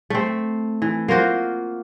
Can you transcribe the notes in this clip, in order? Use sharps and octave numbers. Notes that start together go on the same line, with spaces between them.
A3 C4
E3
A#3 F4 F#4 C5